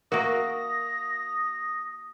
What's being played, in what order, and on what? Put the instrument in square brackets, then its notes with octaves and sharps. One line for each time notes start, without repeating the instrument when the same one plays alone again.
[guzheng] A#3 F#4 [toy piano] A#4 E5 C#6 [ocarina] D#6 [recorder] A#6